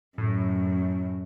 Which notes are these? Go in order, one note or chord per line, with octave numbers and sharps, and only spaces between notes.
F#2 A2